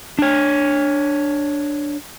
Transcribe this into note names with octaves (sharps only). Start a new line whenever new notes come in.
D4 C#5